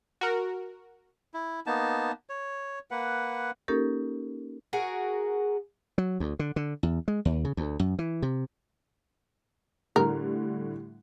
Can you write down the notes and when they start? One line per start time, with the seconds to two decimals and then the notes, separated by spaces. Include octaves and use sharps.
0.21 F#4 A#4
1.34 E4
1.66 A#3 B3 D#4 A5
2.29 C#5
2.91 A#3 B4 F#5
3.68 A#3 C#4 D#4 G4 A4 A#4
4.73 F#4 G#4 A#4
5.98 F#3
6.20 D2
6.39 D3
6.56 D3
6.83 E2
7.08 G#3
7.25 D#2
7.45 C#3
7.57 D2
7.80 F#2
7.99 E3
8.22 C3
9.96 A2 D3 G3 A#4